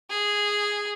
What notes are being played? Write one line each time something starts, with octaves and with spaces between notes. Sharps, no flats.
G#4